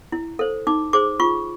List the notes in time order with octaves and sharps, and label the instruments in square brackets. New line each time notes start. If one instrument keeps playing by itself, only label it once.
[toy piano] E4
A4 C5
D#4 D6
G#4 C5 D6
F4 C#6